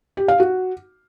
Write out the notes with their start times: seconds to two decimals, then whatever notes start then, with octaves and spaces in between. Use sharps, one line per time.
0.17 G4
0.28 F5
0.40 F#4